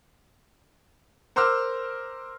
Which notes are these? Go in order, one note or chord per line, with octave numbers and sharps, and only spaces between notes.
A#4 C5 C6 D6 E6 F6